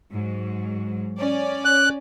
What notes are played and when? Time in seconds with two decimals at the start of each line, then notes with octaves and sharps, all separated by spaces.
0.11 G#2 F#3
1.18 C#4 D5
1.65 F#6